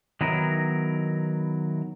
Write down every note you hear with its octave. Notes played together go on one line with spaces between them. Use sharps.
D#3 F#3 B3 E4 A#4